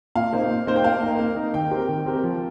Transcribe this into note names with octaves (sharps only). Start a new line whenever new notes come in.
A#2 F5
A#3 D#4 C5
A#2
A#3 D#4 C5
G5
A#3 F5
D#4 A#4
A#3
D#4 A#4
D#3 G5
C4 G4 A#4
D#3
C4 G4 A#4
F3